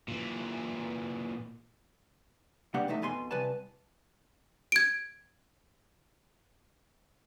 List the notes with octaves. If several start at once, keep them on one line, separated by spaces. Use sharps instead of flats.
A#2 E3
B2 G3 A#3 D4 F#5
E2 A3 D#4 E5
F2 B2 G#5 C6
C2 B4 G#5 A5
G#6 D7